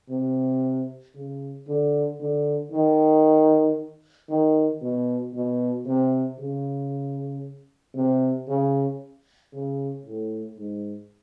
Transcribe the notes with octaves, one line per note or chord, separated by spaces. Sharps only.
C3
C#3
D3
D3
D#3
D#3
B2
B2
C3
C#3
C3
C#3
C#3
A2
G#2